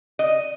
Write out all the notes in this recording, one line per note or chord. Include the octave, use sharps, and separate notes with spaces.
D#5